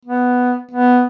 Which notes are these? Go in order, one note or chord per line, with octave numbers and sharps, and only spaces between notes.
B3
B3